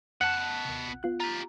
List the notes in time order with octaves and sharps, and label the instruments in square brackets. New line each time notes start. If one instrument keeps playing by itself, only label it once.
[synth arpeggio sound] F2 [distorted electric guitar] B3 A5 [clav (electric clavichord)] F#5
[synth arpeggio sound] D#2 C3
A#1
B3 F4 F#6
[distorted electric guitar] F4 G4 [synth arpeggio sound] A#5